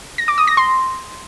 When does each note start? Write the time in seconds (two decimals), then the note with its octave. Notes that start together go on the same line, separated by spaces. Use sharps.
0.18 A#6
0.28 D6
0.38 D#6
0.48 A#6
0.57 C6